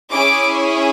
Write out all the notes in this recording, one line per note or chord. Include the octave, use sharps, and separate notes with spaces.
C#4 E4 G#4 D6